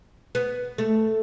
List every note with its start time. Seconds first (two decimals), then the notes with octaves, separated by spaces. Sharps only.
0.35 B3
0.78 A3